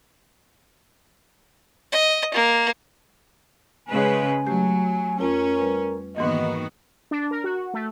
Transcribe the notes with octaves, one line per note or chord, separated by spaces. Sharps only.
D#5
A#3
C#3 G#3 B4 G#5
F#3 A3 G4
F2 C#4 F4 A#4
G3 B4
G#2 D#3 E3 A#3 B3 F#4 D#5
D4
A#4
F#4
A3